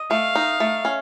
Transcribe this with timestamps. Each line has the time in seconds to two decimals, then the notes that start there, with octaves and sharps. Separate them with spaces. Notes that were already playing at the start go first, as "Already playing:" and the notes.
Already playing: D#5
0.11 A3 F5
0.35 D#4
0.60 A3
0.85 C#4